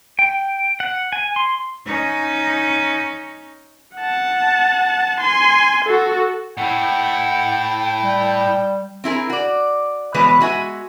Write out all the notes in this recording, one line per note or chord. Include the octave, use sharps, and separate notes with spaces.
G5
F#5
G#5
C6
C#4 D#4
F#5 A5
G#5 C6
F#4 A4
A2 E4 F#5 G5
G3
C4 E4 G#4 A#4
F#4 D5
B2 E3 G#3 B4 C#5
G#3 F#4 E5 G#5